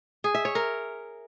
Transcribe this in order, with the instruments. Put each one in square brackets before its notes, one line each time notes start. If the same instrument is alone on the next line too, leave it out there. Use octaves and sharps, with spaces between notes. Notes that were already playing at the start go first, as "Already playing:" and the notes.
[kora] G#4
E5
C#5
A#4